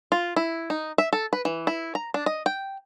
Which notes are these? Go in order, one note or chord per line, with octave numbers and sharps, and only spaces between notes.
F4
E4
D#4
E5
A4
B4
E3
E4
A#5
D4
D#5
G5